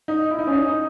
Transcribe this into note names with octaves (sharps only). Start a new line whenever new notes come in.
D#4
E4
D#4
C#4
D#4
D#4